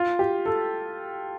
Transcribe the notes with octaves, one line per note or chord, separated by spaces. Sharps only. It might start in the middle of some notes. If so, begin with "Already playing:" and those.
Already playing: F4
G4
A4